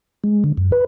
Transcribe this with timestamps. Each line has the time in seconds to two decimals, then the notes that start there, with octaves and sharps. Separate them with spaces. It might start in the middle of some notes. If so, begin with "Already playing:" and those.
0.24 G#3
0.44 D3
0.58 F#2
0.72 B4